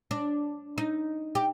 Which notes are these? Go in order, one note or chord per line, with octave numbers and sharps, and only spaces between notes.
D4
D#4
G4